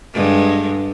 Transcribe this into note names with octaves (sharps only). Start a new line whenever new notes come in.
G2 D3 G#3